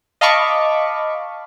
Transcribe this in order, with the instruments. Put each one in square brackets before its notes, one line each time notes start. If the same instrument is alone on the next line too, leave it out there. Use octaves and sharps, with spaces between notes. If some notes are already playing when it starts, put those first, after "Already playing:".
[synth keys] D#5 F5 A5 B5 C#6 D6